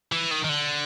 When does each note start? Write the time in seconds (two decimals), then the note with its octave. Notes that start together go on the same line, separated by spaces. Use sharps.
0.12 E3
0.31 D#3
0.44 D#3
0.49 D3